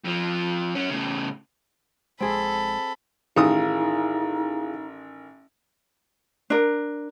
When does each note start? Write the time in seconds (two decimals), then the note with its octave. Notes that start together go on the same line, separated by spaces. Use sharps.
0.05 F2 F3
0.75 F#3 C#4
0.90 A2 C#3
2.20 A#1 G#3 C4 G#4 A4 E5 B5
3.36 A1 D#3 D#4 E4 G#4 F5 D#6
6.50 D4 A#4